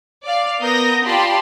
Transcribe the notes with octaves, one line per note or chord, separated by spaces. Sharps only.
D5 F5
B3 A#4 D#6 G6 A#6
F4 G4 D5 A5 B5 C6